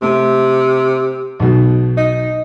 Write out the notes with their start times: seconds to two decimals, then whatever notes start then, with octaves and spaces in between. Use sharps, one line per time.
0.02 C3 A3
1.40 B1 B2
1.97 D#4